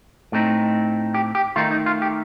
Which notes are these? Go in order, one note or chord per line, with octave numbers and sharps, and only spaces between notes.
A2 A3 C4 D#4
G4
G4
D#3 A3 D#4 F4
D#4
F4
G4